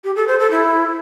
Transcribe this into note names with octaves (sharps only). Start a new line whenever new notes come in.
G4
A4
C5
A4
E4